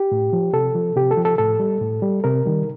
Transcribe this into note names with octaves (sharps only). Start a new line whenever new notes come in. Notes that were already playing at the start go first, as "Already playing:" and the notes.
Already playing: G4
A2
F3
C3 A4
F3
C3 G4
A4
F3
A4
A2 A4
G3
A2
G3
C3 A#4
D#3 G3